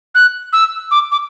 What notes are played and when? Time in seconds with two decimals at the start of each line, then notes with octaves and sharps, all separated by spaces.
0.15 F#6
0.53 E6
0.91 D6
1.12 D6